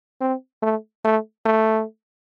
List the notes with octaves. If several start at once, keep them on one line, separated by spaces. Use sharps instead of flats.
C4
A3
A3
A3